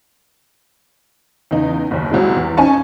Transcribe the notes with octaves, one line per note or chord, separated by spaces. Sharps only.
E2 C#3 D#4
F#1 D#2
C2 F#3 G#3
E2
C#4 D#4 G#5 A5 C#6